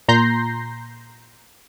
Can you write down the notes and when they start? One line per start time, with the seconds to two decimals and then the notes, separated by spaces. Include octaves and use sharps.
0.08 A#2 A#5 C6 G6 A#6 C7